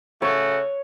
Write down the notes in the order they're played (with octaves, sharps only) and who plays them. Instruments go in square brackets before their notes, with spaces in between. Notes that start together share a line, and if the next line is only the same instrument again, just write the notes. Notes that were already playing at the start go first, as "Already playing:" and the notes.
[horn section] C#3 A3 F#4 [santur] C#5